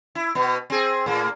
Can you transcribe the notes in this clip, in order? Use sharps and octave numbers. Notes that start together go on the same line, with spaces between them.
E4
B2 B3
C4 G#4
A2 A#3